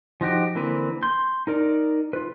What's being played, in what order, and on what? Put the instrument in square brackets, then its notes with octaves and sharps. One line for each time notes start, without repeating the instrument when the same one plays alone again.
[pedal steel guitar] F3 D#4 F#4 G4
D3 E3 A#3 C4 B4
C6 G6
D#4 A#4 D5
F4 B4